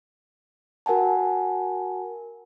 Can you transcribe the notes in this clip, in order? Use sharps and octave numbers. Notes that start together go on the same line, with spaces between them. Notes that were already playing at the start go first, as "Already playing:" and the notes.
F#4 A#4 F#5 G#5 A5